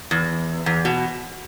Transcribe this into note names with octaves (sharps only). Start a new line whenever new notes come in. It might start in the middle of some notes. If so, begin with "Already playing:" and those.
E2
E2
B2